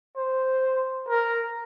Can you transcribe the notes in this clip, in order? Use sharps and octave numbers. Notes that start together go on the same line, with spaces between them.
C5
A#4